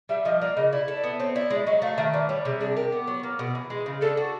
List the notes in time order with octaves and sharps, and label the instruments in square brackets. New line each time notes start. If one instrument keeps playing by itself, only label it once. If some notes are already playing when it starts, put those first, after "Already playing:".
[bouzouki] G3 [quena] E5
[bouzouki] F3 [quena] D#5
[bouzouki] A#3 [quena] D5
[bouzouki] C#3 [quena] D#5
[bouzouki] E4 [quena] D5
[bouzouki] A4
[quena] D5
[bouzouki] B3
[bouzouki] C4 [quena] C#5
[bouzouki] E4 [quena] D5
[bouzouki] G#3 [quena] D5
[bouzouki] F#3 [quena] D#5
[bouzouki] A3 [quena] F5
[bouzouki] D#3 [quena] E5
[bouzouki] E3 [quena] D5
[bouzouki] G3 [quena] C#5
[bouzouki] C3 [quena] G#4
[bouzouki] D4 [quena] G#4
[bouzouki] G4 [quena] A#4
[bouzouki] B3
F#3
A#3
B2
E3
G#3
C#3
[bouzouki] D4 [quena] A4
[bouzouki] F#4